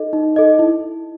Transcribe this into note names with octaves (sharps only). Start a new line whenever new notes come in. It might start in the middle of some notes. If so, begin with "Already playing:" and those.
Already playing: D#4 A4 D#5
D#4
A4 D#5
E4